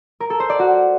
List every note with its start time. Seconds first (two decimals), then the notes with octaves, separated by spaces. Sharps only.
0.20 A#4
0.30 A4
0.40 C5
0.50 D5
0.59 F#4